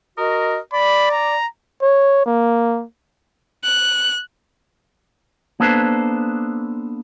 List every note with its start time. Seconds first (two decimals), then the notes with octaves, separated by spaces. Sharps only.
0.18 F#4 A#4 D#5
0.73 D5 B5
1.11 A#5
1.82 C#5
2.26 A#3
3.65 F#6
5.60 A#3 B3 D4 A4 B4 C5